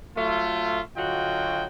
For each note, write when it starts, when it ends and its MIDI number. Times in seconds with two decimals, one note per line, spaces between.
0.17 0.80 54
0.17 0.80 57
0.17 0.80 65
0.97 1.65 50
0.97 1.65 54
0.97 1.65 65
0.97 1.65 66
0.97 1.65 75
0.97 1.65 79